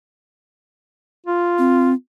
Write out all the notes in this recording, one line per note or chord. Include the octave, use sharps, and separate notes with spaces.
F4
C4